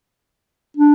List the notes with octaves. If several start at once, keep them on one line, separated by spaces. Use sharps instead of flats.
D4